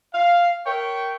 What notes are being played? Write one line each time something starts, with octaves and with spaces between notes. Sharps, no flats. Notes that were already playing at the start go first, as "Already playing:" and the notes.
F5
A#4 C#5 E5 G5